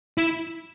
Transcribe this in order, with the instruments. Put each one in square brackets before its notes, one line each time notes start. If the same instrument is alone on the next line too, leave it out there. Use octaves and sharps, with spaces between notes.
[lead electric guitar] E4